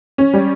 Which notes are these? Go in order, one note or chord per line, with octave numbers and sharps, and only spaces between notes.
C#4
G3